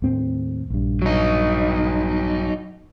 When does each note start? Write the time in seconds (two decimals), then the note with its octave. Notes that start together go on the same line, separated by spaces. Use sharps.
0.02 D#2 A2 C4
0.70 A#1 G2
1.02 F#3 D#4